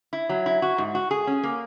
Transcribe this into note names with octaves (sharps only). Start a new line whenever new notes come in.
E4
F#3
E4
F#4
G#2
F#4
G#4
C#4
A#3